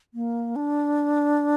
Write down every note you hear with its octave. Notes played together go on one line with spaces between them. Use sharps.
A#3
D4